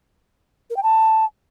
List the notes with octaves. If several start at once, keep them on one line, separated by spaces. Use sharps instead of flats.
A#4
G5
A5